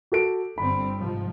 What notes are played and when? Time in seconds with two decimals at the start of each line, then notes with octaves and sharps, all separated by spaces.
0.12 F#4 A4 D7
0.58 G1 G3 C4 B5
0.98 G#2 C3 F3